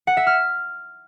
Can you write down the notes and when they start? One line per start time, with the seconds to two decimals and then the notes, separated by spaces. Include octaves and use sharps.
0.07 F#5
0.17 E5
0.27 F6